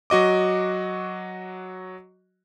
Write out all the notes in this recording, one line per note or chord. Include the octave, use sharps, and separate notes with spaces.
F#3 F#4 D#5 D6